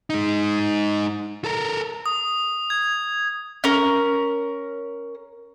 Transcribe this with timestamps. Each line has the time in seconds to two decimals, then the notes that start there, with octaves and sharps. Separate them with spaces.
0.10 G#3 D#4
1.44 A4 A#4
2.06 D#6
2.70 G#6
3.64 C#4 A#4